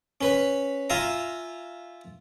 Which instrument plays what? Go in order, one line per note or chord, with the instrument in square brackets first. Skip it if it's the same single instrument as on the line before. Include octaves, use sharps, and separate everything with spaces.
[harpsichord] C#4 B4 B5
F4 E5 F5 G#5 A#5